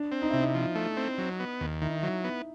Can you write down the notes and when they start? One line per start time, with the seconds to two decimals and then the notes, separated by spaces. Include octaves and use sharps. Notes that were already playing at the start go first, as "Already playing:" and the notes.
Already playing: D4
0.12 C4
0.22 D#4
0.30 C3 E4
0.40 D#4
0.54 F3
0.75 A3
0.97 C4
1.18 F#3
1.40 B3
1.60 D#2
1.82 D#3 E4
1.89 D#4
1.97 E4
2.03 F#3
2.24 B3